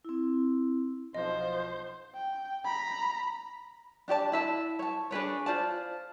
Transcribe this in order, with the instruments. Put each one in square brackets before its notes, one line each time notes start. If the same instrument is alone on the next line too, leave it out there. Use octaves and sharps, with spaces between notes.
[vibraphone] C4 E4
[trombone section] B1 F3 [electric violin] C5 [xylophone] D#5
[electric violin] G5
A#5 B5
[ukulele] D4 G4 D5 A5
E4 E5 A5
C#5 A5
D4 G#4 B4 C#5
F4 C5 D5 A5